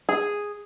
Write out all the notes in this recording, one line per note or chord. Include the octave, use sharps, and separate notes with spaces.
G#4